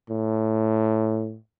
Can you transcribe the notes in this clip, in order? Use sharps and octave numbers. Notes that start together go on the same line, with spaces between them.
A2